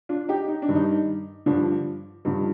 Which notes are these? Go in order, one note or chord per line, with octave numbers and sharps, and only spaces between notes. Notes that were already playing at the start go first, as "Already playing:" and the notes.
D4 F4
D#4 G4
D#4
D4
G2 D#3
D#4
G2 D3 F3 D4
G2 D3 F3 D#4